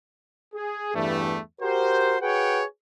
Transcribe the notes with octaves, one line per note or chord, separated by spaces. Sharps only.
G#4
E2 G2 E3 G3 A3
F#4 G4 A#4 C5
F#4 G#4 B4 C#5 F#5 G5